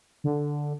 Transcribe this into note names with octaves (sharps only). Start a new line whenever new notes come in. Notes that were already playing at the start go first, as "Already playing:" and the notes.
D3